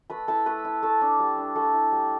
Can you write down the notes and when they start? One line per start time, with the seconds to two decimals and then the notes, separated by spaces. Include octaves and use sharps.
0.10 A3 B4 B5
0.28 E4 A4 A5
0.46 A3 B4 B5
0.65 E4
0.83 A3 A4 A5
1.01 D4
1.19 G3
1.38 D4
1.56 A3 A4
1.74 E4
1.92 G3